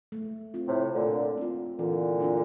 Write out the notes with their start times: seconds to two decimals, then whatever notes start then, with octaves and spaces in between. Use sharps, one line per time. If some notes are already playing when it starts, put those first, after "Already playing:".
0.12 A3
0.54 C4 F4
0.68 A2 C3
0.95 A#2 D3 A3
1.37 C4 F4
1.79 A#2 D3 E3
2.20 A#3 D4 F4